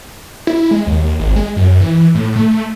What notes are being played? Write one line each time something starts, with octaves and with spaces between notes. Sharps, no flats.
E4
G#3
D#2
G#1
G#3
F#2
E3
A2
A3